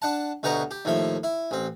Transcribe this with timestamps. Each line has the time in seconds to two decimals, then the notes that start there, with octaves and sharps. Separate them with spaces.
0.02 D4 F#5 A5
0.43 D2 B2 G4 B4 A#5 C#6
0.71 G4
0.85 D#2 A2 F3 E5
1.23 E4
1.51 A1 C4